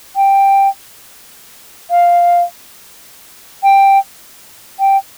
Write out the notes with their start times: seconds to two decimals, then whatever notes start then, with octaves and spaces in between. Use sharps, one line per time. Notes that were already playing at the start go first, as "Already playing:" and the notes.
0.16 G5
1.90 F5
3.63 G5
4.79 G5